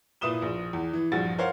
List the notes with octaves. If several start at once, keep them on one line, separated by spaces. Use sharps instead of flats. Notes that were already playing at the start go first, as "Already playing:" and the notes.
A#2 E4 B4 D#6 E7 G7
A#1
E2
E3
A#1 G2 F3 F#4 A6
A#4 C5 C#5 F5 F#5